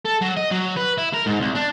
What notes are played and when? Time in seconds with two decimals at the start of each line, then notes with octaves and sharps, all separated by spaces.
0.05 A4
0.21 F#3
0.37 D#5
0.51 F#3
0.76 B4
0.98 E4
1.14 A#4
1.27 G#2
1.41 C2
1.56 D4